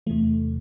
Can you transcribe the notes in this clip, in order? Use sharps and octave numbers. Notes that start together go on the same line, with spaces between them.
E2 C3 E3 A3